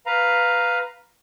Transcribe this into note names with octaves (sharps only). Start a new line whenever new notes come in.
B4 F5 A#5